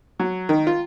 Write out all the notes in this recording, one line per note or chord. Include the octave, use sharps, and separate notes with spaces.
F#3
D#3
F4